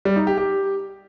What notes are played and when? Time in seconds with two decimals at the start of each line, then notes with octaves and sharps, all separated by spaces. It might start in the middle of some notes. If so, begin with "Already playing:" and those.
0.05 G3
0.16 D#4
0.27 G4
0.38 G4